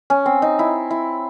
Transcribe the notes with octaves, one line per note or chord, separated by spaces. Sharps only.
C#4
C4
D#4
E4
E4